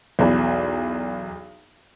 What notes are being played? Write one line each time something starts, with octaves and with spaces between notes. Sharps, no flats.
B1 E2